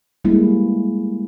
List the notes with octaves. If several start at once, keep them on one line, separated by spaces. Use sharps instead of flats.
G3 G#3 A#3 B3 E4